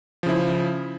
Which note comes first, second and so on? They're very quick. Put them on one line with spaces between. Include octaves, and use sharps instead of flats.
F3 C#3 E4